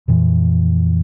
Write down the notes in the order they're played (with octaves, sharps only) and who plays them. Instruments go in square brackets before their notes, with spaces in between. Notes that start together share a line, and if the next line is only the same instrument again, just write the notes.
[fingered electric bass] F2 A#2 E3